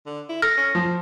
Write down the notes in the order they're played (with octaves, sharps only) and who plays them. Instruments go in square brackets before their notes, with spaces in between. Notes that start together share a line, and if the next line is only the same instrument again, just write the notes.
[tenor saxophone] D3
E4
[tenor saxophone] A4 [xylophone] F6 [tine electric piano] A#6
[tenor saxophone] C#4
[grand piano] F3 [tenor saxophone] C5